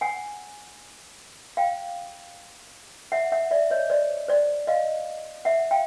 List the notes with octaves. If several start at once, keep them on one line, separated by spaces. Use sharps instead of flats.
F#5 G#5
F5 G5
E5 F#5
E5 F#5
D5 E5
C#5 D#5
C5 D5
C5 D5
D#5 F5
E5 F#5
F5 G5